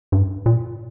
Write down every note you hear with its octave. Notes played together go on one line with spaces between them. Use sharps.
G2
A#2